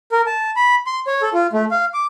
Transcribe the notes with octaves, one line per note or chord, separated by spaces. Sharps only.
A#4
A5
B5
C6
C#5
A4
F4
A3
F5
D6